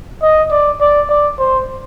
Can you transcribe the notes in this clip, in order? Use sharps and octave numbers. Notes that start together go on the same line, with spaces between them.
D#5
D5
D5
D5
C5